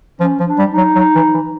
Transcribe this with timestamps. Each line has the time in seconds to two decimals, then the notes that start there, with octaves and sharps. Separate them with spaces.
0.20 F3 C#4
0.39 F3
0.46 D4
0.58 G3
0.71 D#4
0.77 F#3
0.96 F#3
1.15 E3
1.34 E3